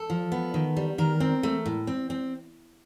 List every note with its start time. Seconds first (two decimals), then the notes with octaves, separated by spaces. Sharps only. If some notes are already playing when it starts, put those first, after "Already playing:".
Already playing: A4
0.10 F3
0.32 B3
0.54 D#3
0.77 G3
0.98 D#3 A#4
1.20 C4
1.43 A3
1.66 A2
1.87 C4
2.10 C4